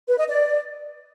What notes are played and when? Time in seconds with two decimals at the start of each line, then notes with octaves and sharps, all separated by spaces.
0.08 B4
0.18 D#5
0.28 D5